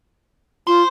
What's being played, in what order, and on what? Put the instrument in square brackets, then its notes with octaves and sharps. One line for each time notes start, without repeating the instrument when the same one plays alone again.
[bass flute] F4 [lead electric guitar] C5 C6